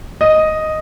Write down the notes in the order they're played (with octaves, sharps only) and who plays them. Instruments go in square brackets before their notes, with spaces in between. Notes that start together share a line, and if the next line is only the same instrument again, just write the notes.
[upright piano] D#5